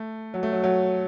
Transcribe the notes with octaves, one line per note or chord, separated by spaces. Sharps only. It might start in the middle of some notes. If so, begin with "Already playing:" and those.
Already playing: A3
F#3
A3
F#3
F#3